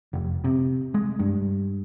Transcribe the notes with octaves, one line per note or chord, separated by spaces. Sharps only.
F1
C3
G#3
G2